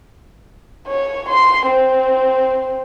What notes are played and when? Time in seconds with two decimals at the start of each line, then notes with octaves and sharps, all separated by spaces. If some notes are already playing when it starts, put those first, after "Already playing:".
0.87 C#5
1.29 C6
1.66 C4